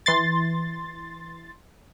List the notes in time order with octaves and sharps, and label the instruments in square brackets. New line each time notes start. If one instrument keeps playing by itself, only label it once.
[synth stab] E3 C6 A6